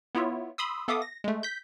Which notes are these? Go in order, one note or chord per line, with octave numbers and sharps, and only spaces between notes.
B3 E4 F4 C#5 E5
B5 C6 D#6 E6
B3 A4 E5 F5 D6 D#6
A#6
G#3 A3
G6 B6